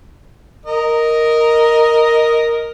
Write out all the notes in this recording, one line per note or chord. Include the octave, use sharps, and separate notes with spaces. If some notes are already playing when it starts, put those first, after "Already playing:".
A#4 D#5